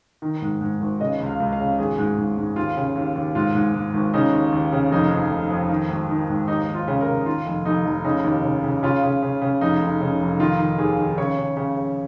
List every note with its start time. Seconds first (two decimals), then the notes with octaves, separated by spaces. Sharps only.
0.22 D#3
0.42 G#2
0.61 G#2
0.80 G#1
1.00 C#3 D#5
1.20 C#2
1.26 F5
1.40 C#2
1.52 F5
1.60 C#3
1.79 G#1 G#4
1.98 G#2
2.18 G#2
2.37 G#2
2.56 D#2 F4
2.76 C#3
2.96 D#2
3.16 D#2
3.35 G#2 F4
3.55 G#2
3.74 G#2
3.94 G#1
4.14 C#3 D#4
4.33 D#2
4.52 D#2
4.72 C#3
4.91 F1 D#4
5.11 F2
5.31 F1
5.50 F2
5.70 D#3
5.89 G#1
6.09 D#3
6.29 G#2
6.48 D#2 D#4
6.68 D#2
6.74 F4
6.88 C#3
7.01 A#4
7.08 C#3
7.26 D#3 F4
7.46 F1
7.65 F1 D#4
7.85 F1
8.04 C#3 D#4
8.24 D#2
8.44 C#3
8.64 C#3
8.83 C#3 F4
9.03 C#3
9.22 C#3
9.42 C#3
9.61 F1 D#4
9.81 F1
10.01 C#3
10.20 F1
10.39 D#3 F4
10.59 D#3
10.78 D#2 G#4
10.99 D#3
11.18 C#3 C#5
11.37 C#3
11.57 C#3
11.77 C#3